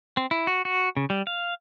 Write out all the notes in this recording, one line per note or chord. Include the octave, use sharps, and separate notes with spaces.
C4
E4
F#4
F#4
C#3
G3
F5